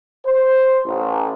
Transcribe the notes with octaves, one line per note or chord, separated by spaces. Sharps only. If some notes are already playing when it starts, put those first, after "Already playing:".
C5
A1